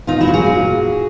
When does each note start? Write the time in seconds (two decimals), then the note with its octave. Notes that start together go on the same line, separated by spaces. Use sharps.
0.07 A#2 D#4 F4
0.21 E4 F#4
0.27 F#3
0.34 F#4 G#4
0.46 A#2